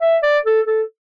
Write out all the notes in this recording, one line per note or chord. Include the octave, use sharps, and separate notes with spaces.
E5
D5
A4
A4